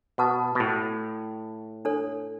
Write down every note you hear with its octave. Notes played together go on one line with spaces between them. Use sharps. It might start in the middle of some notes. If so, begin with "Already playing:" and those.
B2 B4 F#5 A5
B2
A2
D4 A4 C#5